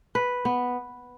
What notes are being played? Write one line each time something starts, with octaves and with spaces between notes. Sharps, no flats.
B4
B3